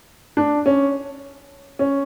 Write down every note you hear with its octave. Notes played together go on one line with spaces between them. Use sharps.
D4
C#4
C#4